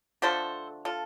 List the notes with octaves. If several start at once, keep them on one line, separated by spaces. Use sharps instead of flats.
D3 F3 A3 A4 C5
F4 A4